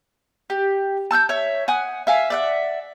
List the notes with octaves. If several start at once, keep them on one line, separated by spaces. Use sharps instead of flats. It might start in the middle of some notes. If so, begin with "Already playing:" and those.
G4
A5 E6 F#6 G6
C#5 E5
F#5 G#5 D#6 F#6
E5 F5 G#5
D5 E5 F#5